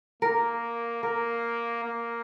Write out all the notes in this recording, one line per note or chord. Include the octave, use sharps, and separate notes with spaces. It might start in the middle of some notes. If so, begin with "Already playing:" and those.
A#3 A#4
A#3 A#4
A#3